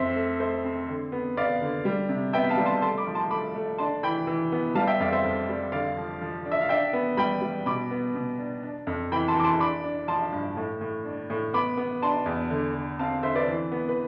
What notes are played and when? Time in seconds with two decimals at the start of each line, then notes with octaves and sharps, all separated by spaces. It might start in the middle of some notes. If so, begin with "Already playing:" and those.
Already playing: F2 C4 C5 E5
0.16 A3
0.40 A3 C5 E5
0.64 C4
0.89 D3
1.12 B3
1.37 B3 D5 F5
1.61 D3
1.85 G3
2.09 C3
2.33 B3 E5 G5
2.49 F5 A5
2.57 G3
2.65 A5 C6
2.82 A3 A5 C6
2.98 B5 D6
3.07 F3
3.15 A5 C6
3.31 A3 B5 D6
3.55 A3
3.78 D4 A5 C6
4.03 E3 G5 B5
4.27 E3
4.52 B3
4.75 G3 F5 A5
4.87 E5 G5
4.99 F2 D5 F5
5.12 C5 E5
5.24 F2
5.49 G3
5.72 D3 D5 F5
5.97 F3
6.21 F3
6.45 D4
6.52 E5
6.61 F5
6.69 D4 E5 G5
6.93 B3
7.17 G3 G5 B5
7.42 G3
7.66 B2 B5 D6
7.91 B3
8.15 B2
8.38 D4
8.63 D4
8.87 F2
9.12 E3 G5 B5
9.28 A5 C6
9.36 E3 D6
9.44 A5 C6
9.59 D4 B5 D6
9.84 D4
10.08 F3 A5 C6
10.32 G2
10.57 A2
10.81 A2
11.05 D4
11.30 A2
11.54 B3 B5 D6
11.77 B3
12.02 D4 A5 C6
12.26 E2
12.50 D3
12.75 D3
12.99 C4 F5 A5
13.23 D3 C5 E5
13.35 B4 D5
13.48 E3
13.72 B3
13.89 B4